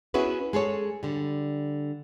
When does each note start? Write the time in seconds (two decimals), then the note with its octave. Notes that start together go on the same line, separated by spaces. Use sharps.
0.14 B3 C#4 E4 F#4 G#4 B4
0.53 G#3 G#4 A4 C#5
1.03 D3 G3